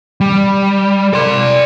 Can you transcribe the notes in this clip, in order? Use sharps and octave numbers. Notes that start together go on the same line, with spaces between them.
G3
D5 C6